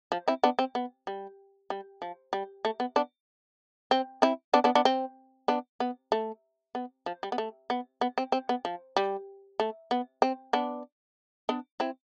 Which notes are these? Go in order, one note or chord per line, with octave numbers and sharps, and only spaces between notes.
F3
C4 E4
B3 D4
C4
B3
G3
G3
F3
G3
A3
B3
B3 D4
C4
C4 E4
B3 D4
B3 D4
B3 D4
C4
B3 D4
B3
A3
B3
F3
G3
B3
A3
B3
B3
C4
C4
B3
F3
G3
A3
B3
C4
B3 D4
B3 D4
C4 E4